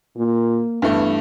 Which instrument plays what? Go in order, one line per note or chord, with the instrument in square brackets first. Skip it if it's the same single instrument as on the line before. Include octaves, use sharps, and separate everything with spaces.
[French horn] A#2 [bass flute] A#3
[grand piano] G2 E3 A3 [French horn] B3